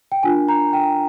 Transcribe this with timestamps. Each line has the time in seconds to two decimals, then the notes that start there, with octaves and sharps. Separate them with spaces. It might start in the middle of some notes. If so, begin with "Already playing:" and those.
0.12 G5
0.23 D4 F4 A#4 G#5
0.48 A#5
0.73 G5